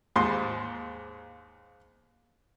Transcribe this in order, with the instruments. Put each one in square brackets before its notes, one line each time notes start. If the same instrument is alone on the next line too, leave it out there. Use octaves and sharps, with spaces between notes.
[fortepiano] D#2 G#2 C6